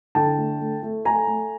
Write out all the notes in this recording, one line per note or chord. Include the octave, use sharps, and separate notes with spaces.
D3 G5 A5
A3
A3
A3
A3 G#5 A#5
A3